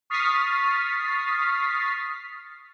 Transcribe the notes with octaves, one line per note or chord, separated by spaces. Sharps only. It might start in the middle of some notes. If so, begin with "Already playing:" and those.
C#6 D#6 F6 A6 B6 C7